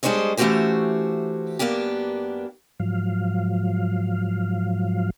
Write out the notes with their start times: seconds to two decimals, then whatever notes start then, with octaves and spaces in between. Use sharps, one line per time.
0.03 G3 G#3 D4 C5 C#5 D#5
0.37 E3 A3 C#4 F#4 G4 C5
1.59 F#2 A#3 B3 D4 G4
2.80 G#2 F3 F#3 F5